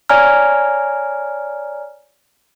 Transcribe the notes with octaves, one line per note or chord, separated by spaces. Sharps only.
C#5 D5 G#5 A#5 F6